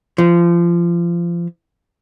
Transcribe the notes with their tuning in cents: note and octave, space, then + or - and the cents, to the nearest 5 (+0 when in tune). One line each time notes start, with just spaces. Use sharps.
F3 -25